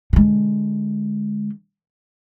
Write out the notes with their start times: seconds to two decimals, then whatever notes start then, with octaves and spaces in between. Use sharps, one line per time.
0.13 D3 G#3